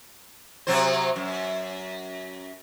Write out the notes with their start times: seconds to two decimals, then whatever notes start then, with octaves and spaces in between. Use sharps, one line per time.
0.67 C3 F#3 C5
1.16 F#2